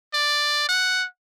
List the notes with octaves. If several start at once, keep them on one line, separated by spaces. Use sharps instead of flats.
D5
F#5